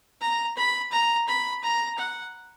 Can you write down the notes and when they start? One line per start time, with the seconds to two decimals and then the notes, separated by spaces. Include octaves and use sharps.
0.21 A#5
0.57 B5
0.92 A#5
1.28 B5
1.63 A#5
1.99 F#5